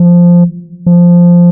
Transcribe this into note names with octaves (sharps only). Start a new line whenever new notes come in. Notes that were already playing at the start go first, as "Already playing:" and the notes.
Already playing: F3
F3